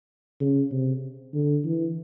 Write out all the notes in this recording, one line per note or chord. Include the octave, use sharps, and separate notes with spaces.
C#3
C3
D3
E3